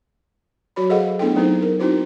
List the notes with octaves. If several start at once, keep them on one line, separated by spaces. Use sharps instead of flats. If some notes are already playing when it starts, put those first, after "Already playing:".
F#3 F#4 C#5 B5
G#4 A4 C5 D#5 F5 F#5
A3 B3 D4 E4 A4 G5
F#3 A3 C4 D#4 E4 C5
A#4
C4 D#4 E4 F#4 C5